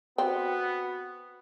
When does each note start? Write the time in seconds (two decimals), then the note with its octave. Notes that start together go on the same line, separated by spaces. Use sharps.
0.18 B3 C4 F#4